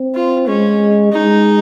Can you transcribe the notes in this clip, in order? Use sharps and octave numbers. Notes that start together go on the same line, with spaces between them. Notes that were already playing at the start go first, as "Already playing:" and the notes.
Already playing: C4
F4
G#3 C#4
G#3 D#4